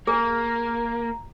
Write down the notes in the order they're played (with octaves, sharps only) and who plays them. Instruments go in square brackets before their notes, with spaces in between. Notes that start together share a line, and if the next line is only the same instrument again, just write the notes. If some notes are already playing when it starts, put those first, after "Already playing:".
[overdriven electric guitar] A#3 [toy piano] G#4 [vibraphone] A#5